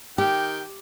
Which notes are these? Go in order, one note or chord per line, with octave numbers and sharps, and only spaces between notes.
D#3 G4 G5